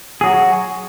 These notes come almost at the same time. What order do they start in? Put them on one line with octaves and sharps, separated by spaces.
G#4 F#3 F#4